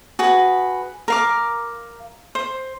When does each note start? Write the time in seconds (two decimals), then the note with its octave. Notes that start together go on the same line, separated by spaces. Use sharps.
0.19 F#4 G#4 B4
1.08 A#4 F5 D6
2.35 C5